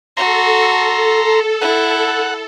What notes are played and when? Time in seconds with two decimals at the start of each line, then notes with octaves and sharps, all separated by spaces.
0.17 F#4 A4 A#5 C6
1.62 E4 F#5